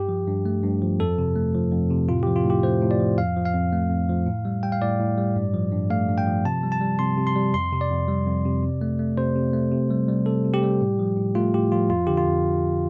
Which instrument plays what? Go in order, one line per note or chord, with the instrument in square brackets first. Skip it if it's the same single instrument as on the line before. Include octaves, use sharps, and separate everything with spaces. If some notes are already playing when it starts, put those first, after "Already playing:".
Already playing: [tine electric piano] G2 G4
F3
G2
A3
G2
F3
F2 A4
C3
A3
F3
F2
C3
A2 F4
F3 G4
F4
A2 G4
A3 C5
A2
D5
F3
F2 F5
F3
F5
F2
A3
F2
F3
A2
G3
G3 G5
F5
A2 D5
A2
G3
G2
F3
G2
A3 F5
G2
G5
F3
C3 A5
G3
A5
G3
C3 C6
C3
C6
G3
F2 C6
C3
D5
F2
G3
F2
C3
C3
A3
A3
C3 C5
C3
A3
C3
G3
G3
C3 A4
C3
G4
G3
A2
F3
A2
A3 F4
A2 G4
F3 F4
F2 F4
D3 G4
F4
F2